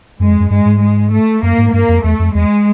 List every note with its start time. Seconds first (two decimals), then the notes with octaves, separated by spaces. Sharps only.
0.20 F#2 G#3
0.30 F2
0.40 F#2
0.50 G2 G#3
0.65 G#2
0.81 G#3
1.11 A3
1.43 F#2 A#3
1.58 G#2
1.73 G2 A#3
1.89 F2
2.04 E2 A3
2.19 F2
2.35 E2 G#3